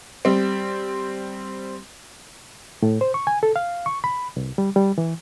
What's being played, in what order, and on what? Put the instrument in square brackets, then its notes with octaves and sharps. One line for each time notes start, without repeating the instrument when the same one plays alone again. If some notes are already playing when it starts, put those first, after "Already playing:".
[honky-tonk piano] G3 C4
[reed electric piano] A2
C5
C#6
G#5
A4
F5
C#6
B5
C2
G3
G3
E3